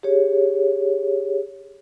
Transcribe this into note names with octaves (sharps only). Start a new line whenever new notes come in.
G4 G#4 C#5